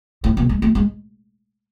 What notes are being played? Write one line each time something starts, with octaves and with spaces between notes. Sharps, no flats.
A2
B2
G#3
A3
G#3